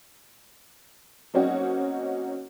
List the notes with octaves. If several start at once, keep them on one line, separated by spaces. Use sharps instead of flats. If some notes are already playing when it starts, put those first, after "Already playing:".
F#3 A#3 C4 C#4 D#4 F#4